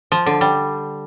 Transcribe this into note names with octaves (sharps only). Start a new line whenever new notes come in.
F3
D3
G3